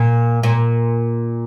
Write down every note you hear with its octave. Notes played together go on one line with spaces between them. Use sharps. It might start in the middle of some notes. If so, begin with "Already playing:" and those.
Already playing: A#2
A#2